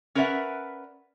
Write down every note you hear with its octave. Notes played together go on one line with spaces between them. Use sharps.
C#4 A#4 B4 D5 E5 F#5